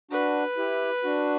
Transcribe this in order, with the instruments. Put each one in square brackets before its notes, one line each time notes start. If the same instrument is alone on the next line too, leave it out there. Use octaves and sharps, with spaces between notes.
[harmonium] D4 F#4 [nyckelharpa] B4
[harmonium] E4 G4
D4 F#4